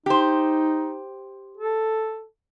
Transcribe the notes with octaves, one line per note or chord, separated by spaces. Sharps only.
D#4 G4 C5
A4